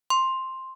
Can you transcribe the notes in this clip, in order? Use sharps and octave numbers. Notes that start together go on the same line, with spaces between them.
C6